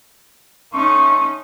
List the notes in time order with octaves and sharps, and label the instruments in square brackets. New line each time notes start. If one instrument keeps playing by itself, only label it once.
[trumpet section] A3 C6 C#6 [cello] C#4 D#4